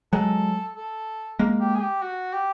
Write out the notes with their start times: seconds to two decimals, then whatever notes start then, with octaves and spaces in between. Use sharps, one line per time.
0.13 F#3 G#3 A4
0.76 A4
1.39 G#3 A#3
1.60 G4
1.75 G#4
1.81 G4
2.02 F#4
2.33 G4